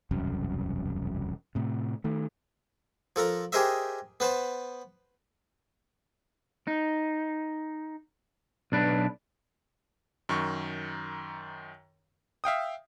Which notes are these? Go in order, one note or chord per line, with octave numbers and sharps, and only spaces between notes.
E1 C2 F#2
A2 C3
D#3 A3
F3 A4 A#4 A#5
G4 G#4 A#4 C5 D#5 E5
B3 B4 C5 A5
D#4
B1 D4 B4
F#2 D#3 C#6
E5 F5 G5 D#6